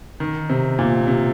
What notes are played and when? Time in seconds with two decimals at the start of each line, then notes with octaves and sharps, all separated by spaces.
0.20 D#3
0.49 C3
0.79 A#2
1.07 C3